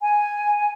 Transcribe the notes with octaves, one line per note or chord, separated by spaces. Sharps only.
G#5